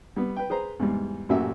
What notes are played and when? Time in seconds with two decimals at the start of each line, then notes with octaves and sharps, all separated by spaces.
0.16 G3 B3
0.36 B4 G5
0.50 G#4 B4 C5 A#5
0.79 E2 G#2 G3
1.29 A1 F#2 A#2 F#4 G4 E5